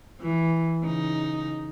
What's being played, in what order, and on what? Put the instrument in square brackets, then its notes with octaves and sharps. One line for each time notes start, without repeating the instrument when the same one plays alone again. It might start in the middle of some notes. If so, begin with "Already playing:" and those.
[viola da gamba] E3
C#3 D#4